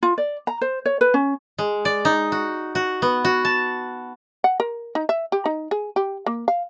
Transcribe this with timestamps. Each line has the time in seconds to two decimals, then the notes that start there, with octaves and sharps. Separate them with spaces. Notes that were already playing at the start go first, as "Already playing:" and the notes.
0.03 F4
0.18 D5
0.47 A#5
0.61 C5
0.86 C#5
1.01 B4
1.14 C#4
1.58 G#3
1.85 D5
2.05 D#4
2.32 F#4
2.75 F#4
3.02 B3
3.25 F#4
3.45 A5
4.44 F#5
4.60 A#4
4.95 D#4
5.09 E5
5.32 G4
5.46 D#4
5.71 G#4
5.96 G4
6.26 A#3
6.48 F5